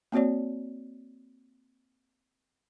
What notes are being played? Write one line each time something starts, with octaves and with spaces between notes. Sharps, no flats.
A#3 C4 F#4 C#5 D5